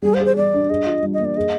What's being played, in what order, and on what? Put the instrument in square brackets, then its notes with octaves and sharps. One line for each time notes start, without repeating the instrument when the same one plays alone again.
[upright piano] G3 [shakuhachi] G#4
[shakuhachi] C5
[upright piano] G#4
[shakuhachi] C5
[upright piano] G3 [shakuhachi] D5
[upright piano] D4
[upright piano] G#4 [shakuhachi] D#5
[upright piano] F4
G3
[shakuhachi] D#5
[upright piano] A#3
[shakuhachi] D5
[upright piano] G#4 [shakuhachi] D#5